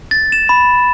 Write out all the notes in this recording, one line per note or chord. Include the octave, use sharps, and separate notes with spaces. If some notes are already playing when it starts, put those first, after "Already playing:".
A6
E7
B5